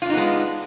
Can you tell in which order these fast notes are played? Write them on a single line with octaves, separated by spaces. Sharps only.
F4 D4 D#4 B3 G#3